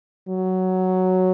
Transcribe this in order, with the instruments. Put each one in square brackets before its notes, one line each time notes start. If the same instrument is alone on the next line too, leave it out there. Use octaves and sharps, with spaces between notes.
[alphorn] F#3